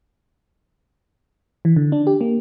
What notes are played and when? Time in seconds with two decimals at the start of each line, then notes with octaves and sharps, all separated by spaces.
1.65 E3
1.76 D3
1.92 D4
2.07 G4
2.21 A#3